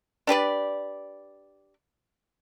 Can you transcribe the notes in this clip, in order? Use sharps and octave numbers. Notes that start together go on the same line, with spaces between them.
D4 G4 B4 D5